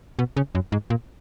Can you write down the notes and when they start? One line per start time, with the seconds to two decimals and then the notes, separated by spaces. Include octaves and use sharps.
0.19 B2
0.37 C#3
0.55 F#2
0.72 G#2
0.90 A#2